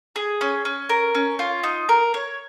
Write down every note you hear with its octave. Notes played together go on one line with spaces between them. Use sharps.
G#4
C#4
C#4
A#4
C#4
F4
D#4
A#4
C#5